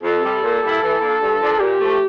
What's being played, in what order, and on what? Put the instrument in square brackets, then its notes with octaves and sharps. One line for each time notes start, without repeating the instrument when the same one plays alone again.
[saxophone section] F2 [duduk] A4
[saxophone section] C3 G3
A#2
G3 A#3 E4
E3
A#3 D4 F4
G2
F3 A#3 D4
[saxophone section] A#2 [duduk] G4
[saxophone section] F3 A3